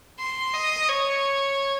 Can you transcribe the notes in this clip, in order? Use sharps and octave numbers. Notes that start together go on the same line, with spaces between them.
C6
D#5
C#5